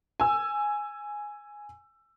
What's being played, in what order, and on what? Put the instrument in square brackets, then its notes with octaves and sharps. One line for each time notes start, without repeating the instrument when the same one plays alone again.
[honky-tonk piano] G#5 E6